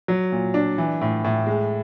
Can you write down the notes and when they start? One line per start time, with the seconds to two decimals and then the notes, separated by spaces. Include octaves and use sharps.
0.08 F#3
0.32 A#2
0.54 D4
0.78 E3
1.01 A2
1.24 A2
1.47 G#3